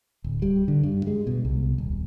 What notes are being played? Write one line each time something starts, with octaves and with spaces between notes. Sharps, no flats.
D1
G3
D3
G2
G#3
B2
C2
D#1